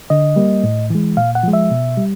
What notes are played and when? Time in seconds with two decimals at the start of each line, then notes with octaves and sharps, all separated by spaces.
0.10 D3 D#5
0.36 G3 A#3
0.64 A2
0.90 E3 G#3
1.17 A#2 F5
1.35 F#5
1.43 F3 G#3
1.53 E5
1.71 B2
1.97 G3